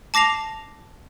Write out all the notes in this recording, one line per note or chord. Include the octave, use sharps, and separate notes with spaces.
A5 D6 A#6 C7 F7